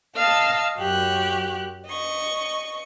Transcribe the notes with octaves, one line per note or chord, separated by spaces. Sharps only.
D#5 F5 A5 E6
F#2 F#4 G4 F#6
D#5 C#6